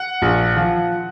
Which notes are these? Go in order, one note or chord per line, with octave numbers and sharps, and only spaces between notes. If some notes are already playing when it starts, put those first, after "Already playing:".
Already playing: F#5
A#1
F3